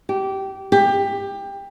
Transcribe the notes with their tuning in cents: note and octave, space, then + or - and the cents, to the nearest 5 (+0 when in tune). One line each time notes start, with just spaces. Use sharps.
G4 -20
G4 +20